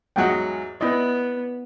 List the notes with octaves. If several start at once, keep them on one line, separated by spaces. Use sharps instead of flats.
E2 G#2 F#3 D#5 F#5 G5
B3 E4 D5 D#5